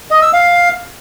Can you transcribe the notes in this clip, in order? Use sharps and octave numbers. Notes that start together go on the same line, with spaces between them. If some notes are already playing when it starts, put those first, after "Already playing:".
D#5
E6
F5